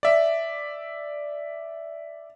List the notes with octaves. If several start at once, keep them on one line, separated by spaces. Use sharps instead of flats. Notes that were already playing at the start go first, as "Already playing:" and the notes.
D5 E5